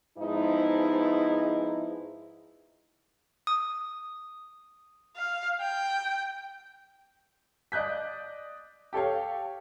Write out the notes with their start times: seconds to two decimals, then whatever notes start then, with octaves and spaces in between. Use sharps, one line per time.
0.18 G#2 F3 G#3 B3 D#4 E4
3.47 D#6
5.16 F5
5.61 G5
7.72 D5 D#5 F#6 G6 B6
8.93 G4 A4 C#5 F5